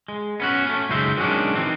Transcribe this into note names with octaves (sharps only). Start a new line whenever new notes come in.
G#3
B3 C#4 F#4
A3 C#4
C#2 F#2 C#3 D#4 C5 E5
D#3 F#3 G#3 C#4 D4
D#3 E3 C4